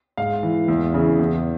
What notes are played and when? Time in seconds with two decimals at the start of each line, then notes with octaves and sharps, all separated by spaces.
0.17 G#2 F5
0.43 E3
0.68 E2
0.94 C#3 E3
1.19 E2